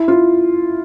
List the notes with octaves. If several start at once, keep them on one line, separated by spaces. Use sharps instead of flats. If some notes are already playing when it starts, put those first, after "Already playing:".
Already playing: E4
F4